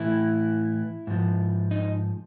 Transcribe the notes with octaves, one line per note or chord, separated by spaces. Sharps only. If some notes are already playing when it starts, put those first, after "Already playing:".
Already playing: A2 E3 E4
G#2 F3
D#4